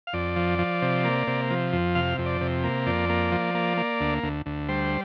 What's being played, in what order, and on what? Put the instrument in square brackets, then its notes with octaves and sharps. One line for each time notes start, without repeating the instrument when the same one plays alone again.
[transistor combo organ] F5
F2 D5
F3
F3
C3
A#3
C3
F3
F2
C3 F5
F2
D5
C3
A#3
F2 D5
A#3
F3
A#3
A#3
D2
D2
D2
G3 C5